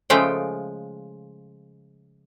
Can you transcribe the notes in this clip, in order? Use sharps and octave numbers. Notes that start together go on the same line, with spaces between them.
C#3 F3 G#3 A3 F4 G5